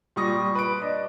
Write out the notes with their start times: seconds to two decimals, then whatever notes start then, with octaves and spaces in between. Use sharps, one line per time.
0.16 A#2 G3 C#6 D#6 A#6
0.55 B4 D7
0.82 D4 D#5